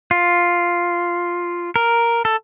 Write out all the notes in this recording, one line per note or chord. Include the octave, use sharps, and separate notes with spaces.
F4
A#4
A4